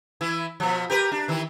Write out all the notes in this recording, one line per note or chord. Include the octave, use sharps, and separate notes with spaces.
E3 E4
B2 F3
G4 A#4 B4
D4
D#3 E3 E4